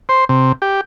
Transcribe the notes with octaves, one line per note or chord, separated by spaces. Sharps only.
C5
C3
G4